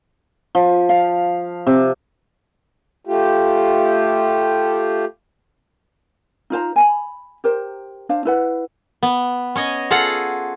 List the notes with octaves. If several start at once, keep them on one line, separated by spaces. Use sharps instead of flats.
F3
F5
C3
A3 F4 G4
D#4 F4 C5 A#5
G#5 A5 B5
G4 A#4 C5
D4 C5 F5
E4 B4 F#5
B3
C#4 C#5 D#5
F4 G#4 A4 F5 F#5